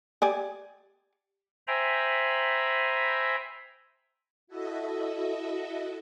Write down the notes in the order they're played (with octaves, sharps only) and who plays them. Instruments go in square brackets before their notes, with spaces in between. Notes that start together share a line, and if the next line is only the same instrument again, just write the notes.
[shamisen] G4 D5 G#5
[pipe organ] C5 E5 G5 G#5 A#5 B5
[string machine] E4 F#4 A4 D#5 E5